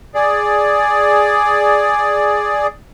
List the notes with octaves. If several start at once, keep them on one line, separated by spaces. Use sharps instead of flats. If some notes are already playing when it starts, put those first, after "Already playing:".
G#4 D5